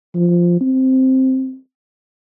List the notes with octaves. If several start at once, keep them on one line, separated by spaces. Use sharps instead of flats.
F3
C4